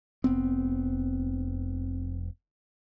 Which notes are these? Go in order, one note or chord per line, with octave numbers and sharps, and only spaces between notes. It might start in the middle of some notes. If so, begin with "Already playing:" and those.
F1 B3 C4